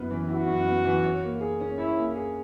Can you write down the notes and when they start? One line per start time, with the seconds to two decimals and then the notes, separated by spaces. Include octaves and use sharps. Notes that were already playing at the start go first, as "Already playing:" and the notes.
Already playing: F#2 B3 E4
0.11 E3
0.28 E4 F#4
0.47 F#2
0.66 B3
0.84 E3
1.04 C#5
1.23 A#3
1.41 G#4
1.60 C#4
1.78 E4 C#5
1.97 A#3
2.16 G#4